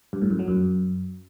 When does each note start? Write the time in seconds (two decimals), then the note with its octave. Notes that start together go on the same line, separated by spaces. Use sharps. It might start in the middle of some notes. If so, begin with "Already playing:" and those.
0.13 G2
0.22 A2
0.30 F#2
0.39 F#3
0.48 F#2